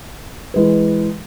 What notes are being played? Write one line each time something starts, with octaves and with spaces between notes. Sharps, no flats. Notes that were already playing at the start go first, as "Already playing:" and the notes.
E3 G#3 B4